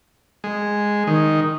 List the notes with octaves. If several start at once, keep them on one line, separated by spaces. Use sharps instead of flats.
G#3
D#3